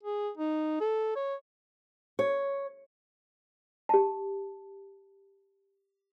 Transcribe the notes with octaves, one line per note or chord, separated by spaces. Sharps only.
G#4
D#4
A4
C#5
C#5
G4 A5